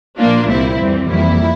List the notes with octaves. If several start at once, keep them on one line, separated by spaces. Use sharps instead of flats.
A#2 F3 A#3 D4 F4
C2 A#2 G3 C4 E4
F2 E3 G3 C4
F2 E3 G3 A#3 E4